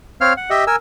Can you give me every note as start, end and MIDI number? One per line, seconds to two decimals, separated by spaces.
0.21 0.33 60
0.21 0.33 73
0.21 0.33 77
0.21 0.33 89
0.37 0.50 78
0.50 0.64 67
0.50 0.64 75
0.50 0.64 76
0.67 0.76 70
0.67 0.76 80
0.67 0.76 88